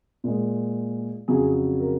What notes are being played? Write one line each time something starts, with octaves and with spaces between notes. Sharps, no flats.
A#2 G#3
F2 C#3 F#3 G#4
A#4